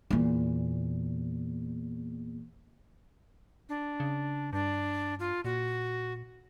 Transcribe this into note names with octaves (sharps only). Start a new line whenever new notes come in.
E2 A#2
D4
C#3
G2 D4
F4
A#2 F#4